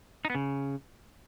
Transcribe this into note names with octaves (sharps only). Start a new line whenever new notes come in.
D#4
B3
C#3